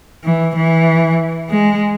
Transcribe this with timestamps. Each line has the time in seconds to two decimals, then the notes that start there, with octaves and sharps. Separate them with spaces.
0.24 E3
0.55 E3
1.50 G#3